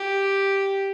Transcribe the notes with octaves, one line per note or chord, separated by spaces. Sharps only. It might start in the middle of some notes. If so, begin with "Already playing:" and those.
Already playing: G4